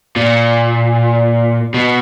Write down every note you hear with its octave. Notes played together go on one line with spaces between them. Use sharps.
A#2
B2